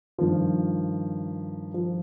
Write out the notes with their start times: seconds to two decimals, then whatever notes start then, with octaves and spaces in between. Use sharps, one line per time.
0.18 G2 D#3 F3
1.74 F3